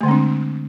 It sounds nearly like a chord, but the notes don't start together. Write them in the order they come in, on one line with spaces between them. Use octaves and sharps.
A3 D3 G#3 C4 D4